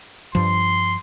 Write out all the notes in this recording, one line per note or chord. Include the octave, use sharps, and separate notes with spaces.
G2 F3 C6